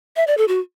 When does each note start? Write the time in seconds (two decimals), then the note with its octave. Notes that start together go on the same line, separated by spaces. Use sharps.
0.16 E5
0.27 D5
0.37 A4
0.48 F#4